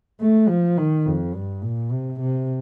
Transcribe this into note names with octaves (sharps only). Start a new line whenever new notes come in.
A3
F3
D#3
F2
G2
A#2
C3
C3